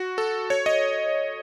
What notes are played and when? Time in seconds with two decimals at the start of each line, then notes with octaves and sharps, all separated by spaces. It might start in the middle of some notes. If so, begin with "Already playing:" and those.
Already playing: F#4
0.18 A4
0.50 C#5
0.66 D#5